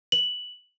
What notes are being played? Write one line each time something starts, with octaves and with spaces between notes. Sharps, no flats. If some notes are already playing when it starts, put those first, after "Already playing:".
F#7